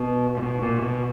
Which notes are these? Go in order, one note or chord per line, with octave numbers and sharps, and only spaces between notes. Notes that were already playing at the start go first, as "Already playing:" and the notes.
Already playing: B2
A#2
B2
A#2
B2